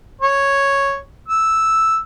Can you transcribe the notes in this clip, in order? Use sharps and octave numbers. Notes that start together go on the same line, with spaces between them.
C#5
E6